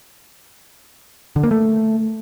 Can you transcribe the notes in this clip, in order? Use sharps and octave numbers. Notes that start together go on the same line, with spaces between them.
D3
A#3
A3